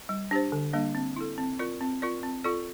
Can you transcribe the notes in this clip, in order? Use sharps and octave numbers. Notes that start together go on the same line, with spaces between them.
G3
D4 G4 C5
D3
G3 A#3 D4
C4
E4 A4
C4
F4 A#4 D5
C4
F4 A#4 D5
C4
F4 A4 D5